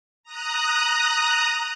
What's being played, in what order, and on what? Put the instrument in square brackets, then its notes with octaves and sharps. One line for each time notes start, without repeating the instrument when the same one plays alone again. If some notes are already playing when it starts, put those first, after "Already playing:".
[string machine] A#5 D#6 F#6